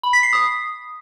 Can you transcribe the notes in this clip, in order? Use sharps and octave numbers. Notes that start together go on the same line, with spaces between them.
B5
B6
C7
D#6